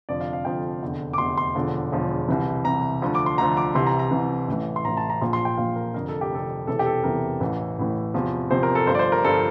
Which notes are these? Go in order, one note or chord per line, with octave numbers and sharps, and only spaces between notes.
F1 F2 D3 F3 D5
F5
F5
F1 F2 D3 F3 G5
F1 E2 D3
D6
F1 E2 D3 C6
C6
E1 E2 D3 F3
E1 E2 D3 F3
C2 C3 E3
C2 C3 E3 A#5
D2 D3 F3
D6
C6
D2 D3 F3 A#5
D6
C2 C3 E3 C6
A#5
A#5
C2 C3 E3
A1 A2 E3
C6
A1 A2 E3 A#5
A5
A#5
A#1 A#2 F3 C6
C6
G5
A#1 A#2 F3 F5
A#4
F1 F2 D3 A#4
A4
G4
F1 F2 D3 A4
E1 E2 C3 E3 A4
G4
A4
E1 E2 C3 E3 A#4
A1 A2 E3
A1 A2 E3
E2 C3 F3
E2 C3 F3 C5
A#4
A4
G1 G2 F3 C5
D5
C5
A#4
G1 G2 F3 A4